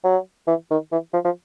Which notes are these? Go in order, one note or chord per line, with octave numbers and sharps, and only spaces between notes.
F#3
E3
D#3
E3
F3
F3